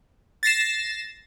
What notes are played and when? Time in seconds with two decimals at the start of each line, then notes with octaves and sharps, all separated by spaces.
0.43 A6 A#6 C7 E7